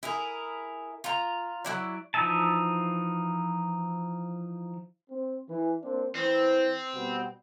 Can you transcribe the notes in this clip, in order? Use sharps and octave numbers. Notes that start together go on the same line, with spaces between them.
E4 G#4 A#4
F4 A#5
F#3 E4 D5
E3 F3 D#4 E5 A5
C4
E3
A#3 C4 D4
E3 C4 C5
B2 G3 B3